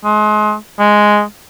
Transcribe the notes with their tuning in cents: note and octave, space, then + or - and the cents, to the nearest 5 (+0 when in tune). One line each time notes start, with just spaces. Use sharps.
G#3 +35
G#3 +0